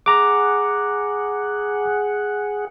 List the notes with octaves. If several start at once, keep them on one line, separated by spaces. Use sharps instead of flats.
G#4 F#5 A#5 D6